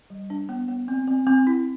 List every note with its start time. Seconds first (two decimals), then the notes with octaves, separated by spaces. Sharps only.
0.10 G3
0.30 D4
0.49 B3
0.68 B3
0.88 C4
1.08 C4
1.27 C4
1.47 E4